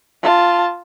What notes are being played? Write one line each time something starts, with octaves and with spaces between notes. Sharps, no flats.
F4 A5